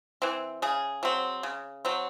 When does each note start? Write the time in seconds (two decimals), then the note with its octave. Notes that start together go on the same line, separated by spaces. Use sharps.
0.22 E3 C4
0.62 C#3 G#4
1.03 F#3 C4
1.43 C#3
1.85 F#3 C4